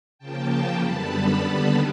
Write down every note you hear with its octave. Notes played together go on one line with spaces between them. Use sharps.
C#3 F3 A#3 G5 A5
F#2 D3 G3 B3 A5 B5
D#2 D3 G3 B3